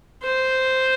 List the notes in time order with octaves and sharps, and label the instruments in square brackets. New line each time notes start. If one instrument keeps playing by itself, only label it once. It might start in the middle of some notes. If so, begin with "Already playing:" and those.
[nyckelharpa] C5